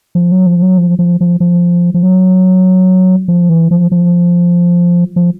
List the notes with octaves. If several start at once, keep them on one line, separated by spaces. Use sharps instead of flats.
F3
F#3
F3
F#3
F3
F3
F3
F3
F3
F#3
F3
E3
F3
F3
F3